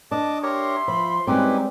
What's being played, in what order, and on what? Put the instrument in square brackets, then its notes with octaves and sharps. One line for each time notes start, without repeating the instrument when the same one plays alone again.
[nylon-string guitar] D4 [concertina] D#5 A5 D6
[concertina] G4 A#4 C#5 [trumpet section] E5 C6
[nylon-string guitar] F3 [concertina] B5
[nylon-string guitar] G3 G#3 C4 [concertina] C#4 D#4 G4 [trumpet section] E4 B4